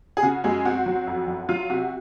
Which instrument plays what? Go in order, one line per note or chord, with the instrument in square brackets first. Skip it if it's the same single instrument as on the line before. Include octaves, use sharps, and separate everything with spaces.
[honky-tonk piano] G#4
C#3 F#4
F#2 G#3 G#4
C4 F#4
F#3
F2
F#1
F#3 F4
C3 F#4